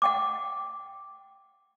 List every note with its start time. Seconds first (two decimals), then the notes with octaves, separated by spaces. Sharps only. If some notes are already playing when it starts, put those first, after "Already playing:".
0.02 F#5 G5 D6